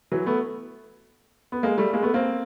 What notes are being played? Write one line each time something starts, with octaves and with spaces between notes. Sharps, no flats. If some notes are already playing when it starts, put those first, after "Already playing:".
E3 F#3
A3 B3
B3
G#3 A#3
G3 A3
G#3 A#3
A3 B3
A#3 C4